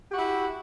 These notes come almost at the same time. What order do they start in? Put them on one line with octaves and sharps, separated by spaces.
G4 F#4 E4